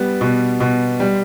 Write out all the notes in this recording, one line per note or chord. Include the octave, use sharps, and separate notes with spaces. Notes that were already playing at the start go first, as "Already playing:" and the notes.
Already playing: G3 B3
B2
B2
G3